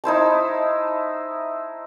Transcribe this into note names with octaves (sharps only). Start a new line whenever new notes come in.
D#4 E4 C5 A5